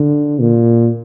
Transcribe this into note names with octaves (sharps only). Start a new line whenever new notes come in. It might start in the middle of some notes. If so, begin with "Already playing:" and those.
Already playing: D3
A#2